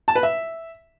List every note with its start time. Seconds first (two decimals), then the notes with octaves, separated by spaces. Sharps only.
0.08 A5
0.15 B4
0.23 E5